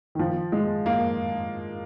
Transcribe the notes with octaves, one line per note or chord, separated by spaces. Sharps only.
D#3
F3
G#3
A#3